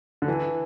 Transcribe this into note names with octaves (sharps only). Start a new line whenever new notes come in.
D3
E3